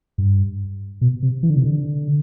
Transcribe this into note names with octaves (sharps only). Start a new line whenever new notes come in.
G2
B2
C3
E3
D3
C3
D3